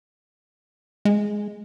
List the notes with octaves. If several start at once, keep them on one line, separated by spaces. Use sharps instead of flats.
G#3